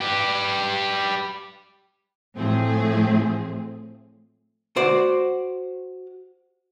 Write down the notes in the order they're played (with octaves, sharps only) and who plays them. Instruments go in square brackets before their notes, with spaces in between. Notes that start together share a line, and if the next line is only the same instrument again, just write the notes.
[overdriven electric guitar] G4 B4
[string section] A2 F3 A3 C4 G#4
[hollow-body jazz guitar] F#4 C5 D5